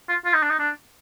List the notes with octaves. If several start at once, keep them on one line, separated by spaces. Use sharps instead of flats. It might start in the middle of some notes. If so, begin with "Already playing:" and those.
F4
F4
D#4
D4
D#4
D4